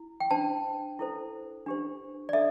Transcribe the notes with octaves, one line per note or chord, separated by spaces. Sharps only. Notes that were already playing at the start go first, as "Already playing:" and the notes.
Already playing: E4
G5
D4 C5 A5
E4 A4 C5
D4 G4 C5
D5
D4 A4 E5